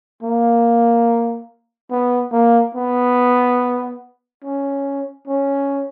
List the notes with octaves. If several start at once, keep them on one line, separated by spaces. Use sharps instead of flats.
A#3
B3
A#3
B3
C#4
C#4